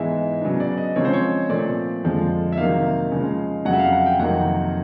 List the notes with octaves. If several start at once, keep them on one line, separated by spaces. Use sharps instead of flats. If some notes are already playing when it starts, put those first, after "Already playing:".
Already playing: G#2 E3 G#3 B3 E5
C#3 F#3 B3 D4
D5
D#5
C#3 F3 G#3 C4 C#5
C5
C#5
A#2 F3 A3 C4 D5
F2 D3 F3 G#3
E5
C3 D#3 F#3 A#3 F5
C#3 F3 G#3
F2 C#3 F#3 F#5
E5
F5
F#5
G5
F2 C3 D#3 F#3 A#3 F#5